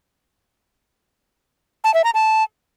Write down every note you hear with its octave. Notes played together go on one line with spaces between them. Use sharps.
A5
E5
A#5
A5